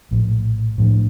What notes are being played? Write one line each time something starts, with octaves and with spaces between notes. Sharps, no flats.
A#1 A2 F3
A2 F3 A3 D4